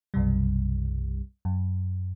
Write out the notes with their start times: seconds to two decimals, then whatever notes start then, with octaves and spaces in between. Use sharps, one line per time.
0.14 B1 F#2 C3 G3
1.45 F#2